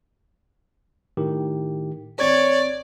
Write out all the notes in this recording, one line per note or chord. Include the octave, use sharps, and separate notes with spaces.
A2 D#3 G4
A1 C4 C#5 D5 G#6